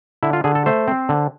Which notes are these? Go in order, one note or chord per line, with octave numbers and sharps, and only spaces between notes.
D3 E4
F4
D3 G#4
A4
A3 C5
C4
D3